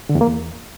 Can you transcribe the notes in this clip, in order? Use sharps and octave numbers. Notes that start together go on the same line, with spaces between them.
D3
E2
A#3
E2